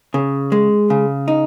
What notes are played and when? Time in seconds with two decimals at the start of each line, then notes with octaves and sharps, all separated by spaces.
0.14 C#3
0.52 G#3
0.90 C#3
1.28 D#4